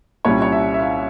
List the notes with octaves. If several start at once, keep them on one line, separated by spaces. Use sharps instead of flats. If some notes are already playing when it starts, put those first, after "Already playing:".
C2 A#2 G3 C#4 E4 C#5
C#5
E5
E5
F5